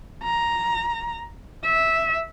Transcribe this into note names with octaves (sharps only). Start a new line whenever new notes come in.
A#5
E5